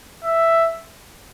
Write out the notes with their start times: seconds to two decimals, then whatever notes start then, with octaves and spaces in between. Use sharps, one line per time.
0.24 E5